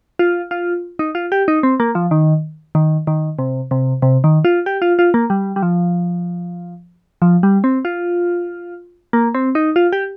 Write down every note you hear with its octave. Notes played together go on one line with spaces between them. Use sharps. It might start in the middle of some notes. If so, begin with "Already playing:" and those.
F4
F4
D#4
F4
G4
D#4
C4
A#3
F3
D#3
D#3
D#3
C3
C3
C3
D#3
F4
G4
F4
F4
A#3
G3
G3
F3
F3
G3
C4
F4
A#3
C4
D#4
F4
G4